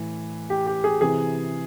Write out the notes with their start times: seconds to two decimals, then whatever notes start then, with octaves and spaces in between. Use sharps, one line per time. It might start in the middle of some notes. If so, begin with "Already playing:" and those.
Already playing: A2 E3
0.50 G4
0.67 G4
0.84 G#4
1.01 C3 E3 G#4